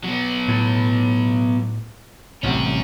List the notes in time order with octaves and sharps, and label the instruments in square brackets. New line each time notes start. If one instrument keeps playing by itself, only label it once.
[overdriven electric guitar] F#3 B3
[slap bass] A2
[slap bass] A1 C3 G3 [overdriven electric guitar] C#4 F#4